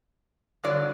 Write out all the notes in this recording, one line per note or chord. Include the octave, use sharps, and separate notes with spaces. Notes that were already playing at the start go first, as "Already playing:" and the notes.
G2 D3 F#3 D5